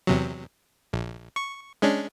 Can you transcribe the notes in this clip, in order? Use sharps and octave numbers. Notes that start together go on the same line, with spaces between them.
E2 C3 F#3
A#1
C#6
G#3 C#4 D4